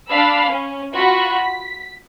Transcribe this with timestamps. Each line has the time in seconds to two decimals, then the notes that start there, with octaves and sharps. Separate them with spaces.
0.10 D4 F5 B5 E6
0.49 C#4
0.94 F4 F#4 B5 C#6
1.42 B6